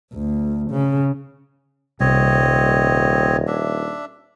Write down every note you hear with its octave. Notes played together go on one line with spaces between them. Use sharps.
D2
C#3
D#1 C2 C4 C#5 D#5
D4 E5